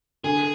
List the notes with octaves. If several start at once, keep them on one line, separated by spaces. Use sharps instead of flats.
D3 G#4